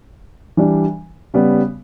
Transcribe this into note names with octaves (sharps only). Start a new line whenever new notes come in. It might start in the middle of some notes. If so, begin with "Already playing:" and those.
E3 G3 D4
C#3 G3 B3